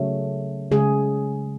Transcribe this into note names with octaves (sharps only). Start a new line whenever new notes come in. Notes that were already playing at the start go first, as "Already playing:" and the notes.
Already playing: C#3 F#3 A3
C#3 G#3 G#4